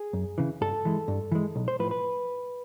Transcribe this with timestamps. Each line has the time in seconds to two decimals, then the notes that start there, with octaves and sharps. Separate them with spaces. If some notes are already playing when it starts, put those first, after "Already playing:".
Already playing: G#4
0.13 F#2
0.38 C#3 E3
0.61 G2 A4
0.85 E3 G#3
1.08 G2
1.32 E3 G#3
1.56 B1
1.68 C5
1.79 A2 F3 B4
1.91 B4